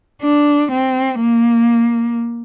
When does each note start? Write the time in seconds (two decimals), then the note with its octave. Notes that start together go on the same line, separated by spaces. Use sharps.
0.22 D4
0.72 C4
1.21 A#3